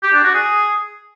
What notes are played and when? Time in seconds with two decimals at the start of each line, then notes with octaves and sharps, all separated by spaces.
0.03 G4
0.13 D4
0.23 F#4
0.34 G#4